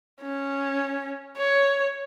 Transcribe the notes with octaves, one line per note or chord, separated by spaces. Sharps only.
C#4
C#5